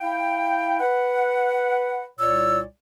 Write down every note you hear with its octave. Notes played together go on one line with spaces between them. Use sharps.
E4 F5 G5
B4 F#5
C2 A#2 C#5 D5 E6